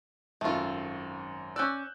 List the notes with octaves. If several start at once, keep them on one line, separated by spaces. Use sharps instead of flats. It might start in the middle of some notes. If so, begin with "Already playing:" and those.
G#1 F#2 A3 F4
C#4 D5 E6 F#6 G6